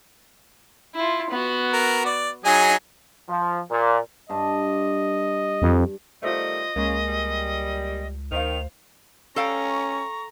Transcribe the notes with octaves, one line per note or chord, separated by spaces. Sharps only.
E4 F4
B3 F#4
A#4
D5
F#3 D#4 G#4 D#5 G#5
F3
A#2
G2 D#5 A5
F2
D#3 G3 A3 F4 C5 D#5
C#2 C#3 G#3 A#3
G3
D2 D#3 C5 F5 F7
C#4 A4 F5 G5 A#5 C#6